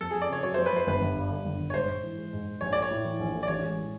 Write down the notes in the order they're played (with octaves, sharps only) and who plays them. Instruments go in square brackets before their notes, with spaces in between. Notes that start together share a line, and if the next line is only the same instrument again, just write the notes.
[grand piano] F2 [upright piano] A4
[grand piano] F2 [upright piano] G#4
[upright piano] D5
[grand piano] C#3 [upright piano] C#5
[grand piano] F#3 [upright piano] C#5
[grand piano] F2 [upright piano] C5
[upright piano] B4
[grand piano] F2 [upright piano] C5
[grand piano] G1 [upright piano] B4
[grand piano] G1
G2
D3
G1
G1
[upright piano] C#5
[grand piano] G#2 [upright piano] C5
[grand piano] G#2
E3
G#3
G#2
G#2
[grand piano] A#1 [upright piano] C#5
[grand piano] A3 [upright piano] D5
[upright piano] C#5
[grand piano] A2
E3
A#1
A3
[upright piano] D5
[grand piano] A1 [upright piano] C#5
[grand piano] G#3
A2